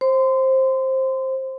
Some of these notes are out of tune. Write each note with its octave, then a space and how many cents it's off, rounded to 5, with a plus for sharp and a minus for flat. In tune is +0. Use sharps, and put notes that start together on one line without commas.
C5 +15 C6 -30